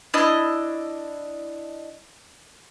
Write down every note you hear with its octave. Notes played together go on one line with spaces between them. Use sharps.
D4 E4 D#5